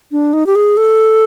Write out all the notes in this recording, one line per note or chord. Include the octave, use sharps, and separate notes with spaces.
D4
D#4
G4
G#4
A4